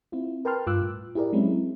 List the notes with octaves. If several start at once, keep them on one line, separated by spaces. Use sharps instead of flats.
C4 E4 F4
A#4 B4 G5 A5 C6 F6
G2 F4 D6 E6 F#6
A2
E4 G4 G#4 A#4 D5
F#3 G#3 C4 C#4 E4